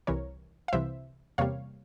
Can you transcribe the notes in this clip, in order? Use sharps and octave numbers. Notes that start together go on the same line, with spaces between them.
C2 C3 E3 A#4 C#5
F5
C2 C3 E3 C5 E5
E2 C3 G3 A#3 C#5 F5